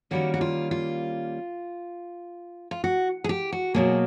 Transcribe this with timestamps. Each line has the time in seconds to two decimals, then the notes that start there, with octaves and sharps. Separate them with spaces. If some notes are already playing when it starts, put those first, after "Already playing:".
0.11 D#3 G3 A#3 C#4 F#4
0.34 F#4
0.41 F4
0.71 F4
2.71 F4
2.84 F#4
3.24 G#4
3.29 G4
3.52 F#4
3.74 B2 F#3 A#3 G#4